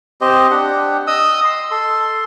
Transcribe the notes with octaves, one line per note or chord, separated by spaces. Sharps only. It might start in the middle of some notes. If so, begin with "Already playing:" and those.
C4 G4 C5 D#5
D4 G4 F#5
D#5 D#6 E6
C6
A4 C6